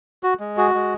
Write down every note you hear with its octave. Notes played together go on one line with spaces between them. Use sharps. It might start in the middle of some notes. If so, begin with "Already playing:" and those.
F#4
G#3
F#4 G#4
G#3